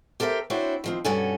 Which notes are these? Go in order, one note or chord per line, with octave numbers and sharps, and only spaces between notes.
G4 A4 A#4 C5 E5
C4 D4 E4 F#4 C5 C#5
D#3 F3 C4
G2 B2 C#4 A4 F#5 G#5